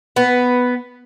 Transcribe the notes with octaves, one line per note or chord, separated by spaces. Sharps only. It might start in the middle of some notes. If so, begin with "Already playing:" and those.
B3